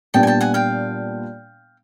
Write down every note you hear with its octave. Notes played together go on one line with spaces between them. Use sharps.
A#2 G3 B3 D4 G5 A5
G#5
G5 A5
F#5 G#5
F5 G5